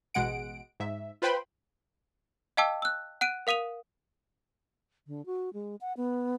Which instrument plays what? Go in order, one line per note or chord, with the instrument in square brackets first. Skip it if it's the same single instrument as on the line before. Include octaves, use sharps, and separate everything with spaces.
[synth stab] A1 B2 G#3 F#5 D7
G#2 E5
F4 B4 C5 G5 B5 C6
[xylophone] D#5 F5 G5 A5 D6 E6
E6 F#6
F#5 F#6 D7 D#7
A#4 F5 D#6 D#7 F7
[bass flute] D3
F#4
G#3
F#5
B3